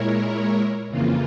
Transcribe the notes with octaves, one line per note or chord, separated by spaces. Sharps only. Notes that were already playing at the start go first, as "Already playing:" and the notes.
Already playing: A#2 G#3 E4 A#4 C#5
F2 C#3 E3 A#3 F4